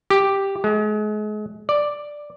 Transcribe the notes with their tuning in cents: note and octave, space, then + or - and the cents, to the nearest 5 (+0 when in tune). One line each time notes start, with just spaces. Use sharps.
G4 +0
G#3 +35
D5 +5